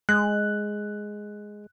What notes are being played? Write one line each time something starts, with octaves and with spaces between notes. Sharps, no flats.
G#3 F#6